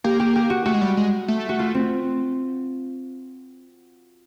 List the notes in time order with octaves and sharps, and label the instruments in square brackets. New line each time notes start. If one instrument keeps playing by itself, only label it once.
[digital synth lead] A#3 [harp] G4
[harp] G4
G4
F#4
[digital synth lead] A3 [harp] F#4
[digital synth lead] G#3
G3
G#3
A3
[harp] F#4
F4
C4